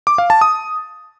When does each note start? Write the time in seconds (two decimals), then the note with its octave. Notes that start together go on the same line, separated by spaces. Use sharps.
0.07 D6
0.18 F5
0.30 A5
0.41 D#6